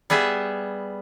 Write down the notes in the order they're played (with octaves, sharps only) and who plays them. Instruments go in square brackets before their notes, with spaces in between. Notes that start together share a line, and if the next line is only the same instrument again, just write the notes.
[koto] G3 B3 G#4 E5